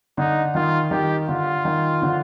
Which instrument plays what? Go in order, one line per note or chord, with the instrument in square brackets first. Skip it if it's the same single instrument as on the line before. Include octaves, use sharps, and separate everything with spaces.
[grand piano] D3 [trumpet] D#4
[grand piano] D#3 [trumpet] F4
[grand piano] D#3 [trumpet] G4
[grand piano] D3 [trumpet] F4
[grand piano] D#3
D3 F3